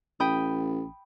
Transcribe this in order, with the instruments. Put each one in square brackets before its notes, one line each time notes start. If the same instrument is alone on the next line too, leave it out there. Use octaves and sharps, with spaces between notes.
[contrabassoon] A1 [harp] G5 B5 D#6